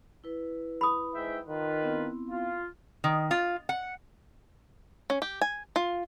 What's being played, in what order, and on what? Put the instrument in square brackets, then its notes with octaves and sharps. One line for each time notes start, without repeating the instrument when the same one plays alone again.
[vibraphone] E4 B4
[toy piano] B5 D#6
[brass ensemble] G#2 E5 G5
D#3 F4 B4
[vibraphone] B3 C4 E4
[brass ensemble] F4
[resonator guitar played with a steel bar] D#3
F4
F#5
[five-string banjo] C#4
G4
G#5
F4